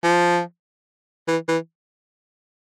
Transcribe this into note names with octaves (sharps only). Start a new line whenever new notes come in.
F3
E3
E3